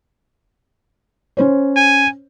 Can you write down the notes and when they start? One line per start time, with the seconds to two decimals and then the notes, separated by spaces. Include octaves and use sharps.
1.37 C#4 C5 C#5
1.76 G#5